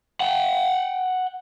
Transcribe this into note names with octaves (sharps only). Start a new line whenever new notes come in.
F#5 G5